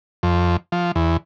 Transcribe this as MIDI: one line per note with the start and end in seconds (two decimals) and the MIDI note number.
0.23 0.56 41
0.72 0.92 53
0.96 1.17 40